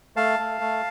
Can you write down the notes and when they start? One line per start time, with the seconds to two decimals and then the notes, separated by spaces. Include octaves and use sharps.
0.16 A3 F5 A5
0.39 A3
0.61 A3